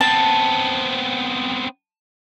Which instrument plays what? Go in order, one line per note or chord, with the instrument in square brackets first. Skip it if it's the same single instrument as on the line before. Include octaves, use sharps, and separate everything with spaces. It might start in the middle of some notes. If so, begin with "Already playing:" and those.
[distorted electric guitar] B3 C4 [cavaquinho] A5